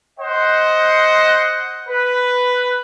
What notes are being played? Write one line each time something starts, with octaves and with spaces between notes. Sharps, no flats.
C5 D#5 F#5
B4